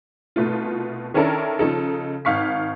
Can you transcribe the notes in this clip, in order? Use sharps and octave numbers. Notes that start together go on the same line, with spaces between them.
C2 B2 A3 F4
D#3 C#4 D4 E4 A4 A#4
C#3 F3 D#4 A4
G#1 F5 C#6 B6